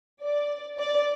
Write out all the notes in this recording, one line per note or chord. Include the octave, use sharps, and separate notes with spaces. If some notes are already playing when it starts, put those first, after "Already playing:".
D5
D5